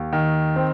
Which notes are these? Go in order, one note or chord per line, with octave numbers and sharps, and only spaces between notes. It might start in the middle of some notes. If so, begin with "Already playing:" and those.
Already playing: D#2
D#3
C4